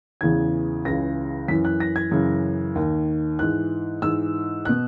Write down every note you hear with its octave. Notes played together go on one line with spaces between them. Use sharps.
E2 C#3 E3 G#6
C#2 C#3 E3 A#6
F#2 E3 B6
F#6
A#6
G#6
F#2 C#3 E3
D#2 D#3
G#2 E3 F#6
G#2 E3 E6
B2 F#6